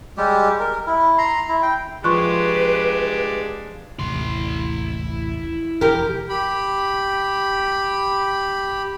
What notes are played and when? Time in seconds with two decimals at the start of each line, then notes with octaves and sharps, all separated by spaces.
0.17 G3 G#3 G4
0.60 A#4
0.87 E4
1.18 A#5 C6
1.49 E4
1.63 G5
2.04 F3 G#3 D4 G4 B4 C6 C#6 F#6
3.99 A1 D#2 C3 E4 C6
5.81 E1 F2 G4 A#4
6.29 G4 B5